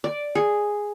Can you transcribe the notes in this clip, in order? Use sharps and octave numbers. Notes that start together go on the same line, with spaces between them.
D5
G#4